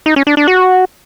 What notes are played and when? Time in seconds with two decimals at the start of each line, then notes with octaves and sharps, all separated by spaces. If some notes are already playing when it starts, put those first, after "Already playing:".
0.06 D#4
0.16 C#4
0.27 D4
0.37 D4
0.48 F#4